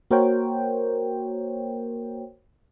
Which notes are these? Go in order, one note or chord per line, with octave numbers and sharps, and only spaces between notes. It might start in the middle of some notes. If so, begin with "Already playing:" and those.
A#3 F#4 A#4 C5 C#5 G5